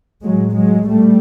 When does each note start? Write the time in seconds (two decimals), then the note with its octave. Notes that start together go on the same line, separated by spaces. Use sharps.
0.24 A2 F#3 G#3
0.56 F#3 G#3
0.87 A#2 G3 A3